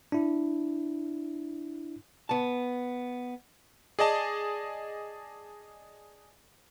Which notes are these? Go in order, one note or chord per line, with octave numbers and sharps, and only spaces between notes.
D4 E4
B3 A5
G#4 D5 D#5 A5